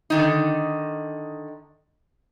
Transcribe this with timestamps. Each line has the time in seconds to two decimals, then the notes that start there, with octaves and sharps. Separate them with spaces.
0.10 D3 D#3 D#4